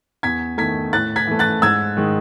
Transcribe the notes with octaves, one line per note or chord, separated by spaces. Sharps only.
E2 G#6 B6
D#3 A3 G#6 B6
A2 F#6 A6
G#6 B6
E3 A3
F#6 A6
G#2 E6 G#6
D#3 G#3